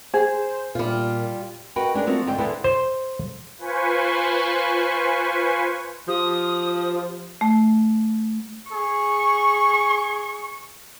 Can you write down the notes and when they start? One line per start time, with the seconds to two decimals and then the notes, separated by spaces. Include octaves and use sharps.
0.14 G#4 C5
0.75 A#2 G3 F4
1.76 F#4 A#4 B4 D#5 G5
1.94 G#3 D4 D#4 A#4
2.07 F3 A3 C4 F#4 A#4 C#5
2.26 G#2 D3 C5 G5
2.38 E2 D3 B3 E4 A4 C5
2.64 C5
3.58 F4 B4 C5 G#5 C#6
6.08 F3 G4 D#6
7.41 A3
8.72 G#4 C#6